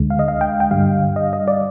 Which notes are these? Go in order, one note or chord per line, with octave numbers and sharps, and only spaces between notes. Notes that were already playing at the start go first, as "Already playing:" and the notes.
Already playing: D2 D3 G#3
F5
D#5
F5
G5
G5
G2 D3 G3 F5
D#5
D#5
D5